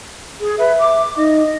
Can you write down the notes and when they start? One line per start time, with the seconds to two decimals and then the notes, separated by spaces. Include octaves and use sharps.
0.40 G#4
0.58 B4 E5
0.79 D6
1.17 D#4 D#5